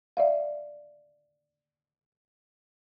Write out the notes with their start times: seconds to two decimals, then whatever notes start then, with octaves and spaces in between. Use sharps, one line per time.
0.17 D5 E5 F5